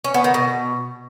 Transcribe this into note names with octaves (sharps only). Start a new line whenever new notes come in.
C#4
B3
D#3
B2